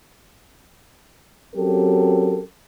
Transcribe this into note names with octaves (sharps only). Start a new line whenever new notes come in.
F#3 C4 C#4 G4 A4 A#4